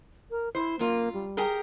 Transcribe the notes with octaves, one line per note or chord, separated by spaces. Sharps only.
A#4
E4 C5
F#2 A#3 F4
G3
G4 G#4 A#4